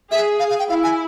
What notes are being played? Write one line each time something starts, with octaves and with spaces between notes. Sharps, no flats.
G#4 E5
F5
F5
G5
E4 F5
G#5